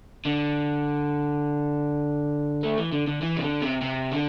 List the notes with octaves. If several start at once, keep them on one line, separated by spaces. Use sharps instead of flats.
D3
A3
E3
D3
D3
E3
C3
D3
C3
C3
D3